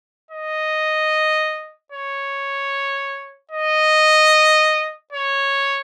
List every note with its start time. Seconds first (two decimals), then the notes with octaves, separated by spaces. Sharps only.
0.31 D#5
1.92 C#5
3.52 D#5
5.12 C#5